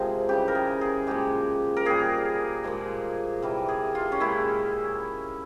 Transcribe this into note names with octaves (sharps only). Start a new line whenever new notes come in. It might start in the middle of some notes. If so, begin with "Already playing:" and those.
Already playing: C3 F3 G#3 G#4 A#4
C#3 E3 G3 G4
A#4
G#4
G#4
A#2 F3 G#3 G4
A#4
A#2 G3 G#4
A#2 F3 G#3
C3 E3 G3 A#4
G#4
F4
C#4
A#2 G#3 E4